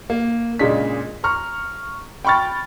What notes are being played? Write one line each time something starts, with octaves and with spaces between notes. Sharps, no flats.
A#3
A#2 C#3 G#3 D4 D#5 B6
A#5 C#6 F6
G5 B5 C#6 F6 A6